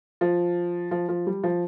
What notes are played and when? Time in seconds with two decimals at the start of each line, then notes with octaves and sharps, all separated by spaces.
0.21 F3
0.91 F3
1.09 F3
1.27 G3
1.44 F3